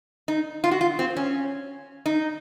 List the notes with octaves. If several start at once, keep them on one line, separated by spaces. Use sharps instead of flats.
D#4
F4
F#4
F4
C4
C#4
D#4